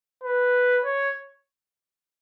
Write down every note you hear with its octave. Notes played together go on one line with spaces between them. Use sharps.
B4
C#5